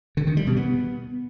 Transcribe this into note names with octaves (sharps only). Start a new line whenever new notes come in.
D3
D#3
G3
B2
B3